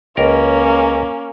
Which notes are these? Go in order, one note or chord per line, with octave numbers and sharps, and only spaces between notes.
C#2 A#3 C#4 A#4